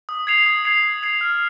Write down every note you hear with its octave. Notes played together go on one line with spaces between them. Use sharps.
D#6
G#6 C7 F7
D#6
G#6 C7 F7
D#6
G#6 C7 F7
F6